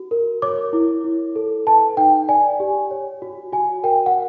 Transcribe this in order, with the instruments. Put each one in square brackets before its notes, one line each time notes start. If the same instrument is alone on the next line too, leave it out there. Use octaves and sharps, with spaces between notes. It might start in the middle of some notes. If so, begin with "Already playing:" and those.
Already playing: [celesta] F#4
A#4
C#5 D6
E4
E4
A4
B4 A5
D#4 G5
D5 G#5
G4
C#5
F#4
F#4 G#5
A#4 G5
F#5